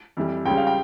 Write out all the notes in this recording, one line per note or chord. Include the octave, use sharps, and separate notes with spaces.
F2 E3 G3
C#2 C#3 G3 G5
F5
G5